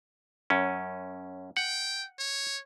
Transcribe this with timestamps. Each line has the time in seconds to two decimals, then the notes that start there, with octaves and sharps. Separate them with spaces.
0.50 F#2 C#4
1.57 F#5 G5
2.19 C#5